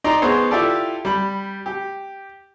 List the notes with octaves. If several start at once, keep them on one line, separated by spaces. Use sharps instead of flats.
D#4 D5 A#5 C6
B3 D#4 G#4 C5 C#5
E4 F4 G4 A4 D5
G3 B5
G4